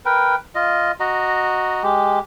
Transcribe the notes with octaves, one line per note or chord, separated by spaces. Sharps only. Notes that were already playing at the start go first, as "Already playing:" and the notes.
A#4 B4 G5
F4 D#5
F#4 D#5 A#5
G#3 G4